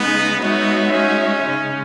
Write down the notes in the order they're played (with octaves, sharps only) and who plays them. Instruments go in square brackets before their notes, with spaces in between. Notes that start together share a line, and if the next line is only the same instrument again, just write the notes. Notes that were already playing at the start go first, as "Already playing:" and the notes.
Already playing: [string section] C#3 G#3 D#4 [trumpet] B3
[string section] G#3 D#4 F#4 C#5 E5 [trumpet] B3
[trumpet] C#4
[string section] C#3 G#3 D#4